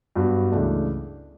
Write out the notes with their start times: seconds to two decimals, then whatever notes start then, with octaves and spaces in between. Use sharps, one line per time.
0.16 G2 F#3 B3 F#4
0.51 C#2 C#3 E3 A3 D4